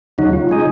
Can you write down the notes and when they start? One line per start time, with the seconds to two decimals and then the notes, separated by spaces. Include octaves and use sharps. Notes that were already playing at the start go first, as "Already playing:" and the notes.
0.18 D#2 C#3 F#3 D#4
0.33 F4
0.49 C#3 G#3 D#4